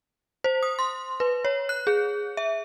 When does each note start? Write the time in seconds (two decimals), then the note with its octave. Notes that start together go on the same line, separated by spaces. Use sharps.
0.44 C5
0.63 D#6
0.79 C6
1.20 B4
1.45 C#5
1.69 F#6
1.87 G#4
2.37 E5